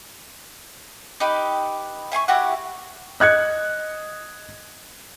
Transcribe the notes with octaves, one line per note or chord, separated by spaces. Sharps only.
D#4 G4 B4
E5 G#5 C6 C#6
E4 F#4 G4 F#5
D#5 F#6 G#6 C#7